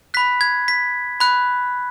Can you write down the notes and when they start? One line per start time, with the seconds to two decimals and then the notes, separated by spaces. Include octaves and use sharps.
0.14 B5 F#6 B6
0.41 G#6
0.68 B6
1.20 B5 F#6